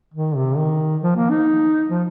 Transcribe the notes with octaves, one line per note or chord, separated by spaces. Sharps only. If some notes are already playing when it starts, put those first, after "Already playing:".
D#3
C3
D#3
F3
A#3
D#4
F3